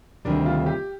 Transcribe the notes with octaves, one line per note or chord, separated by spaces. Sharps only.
D2 C3 D#3 G3 D4
F4
G4